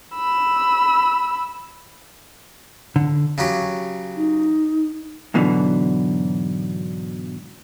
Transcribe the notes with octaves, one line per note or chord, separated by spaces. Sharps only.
B5 E6
D3
C#3 F#3 G4
D#4
G#2 B2 D3 E3 F#3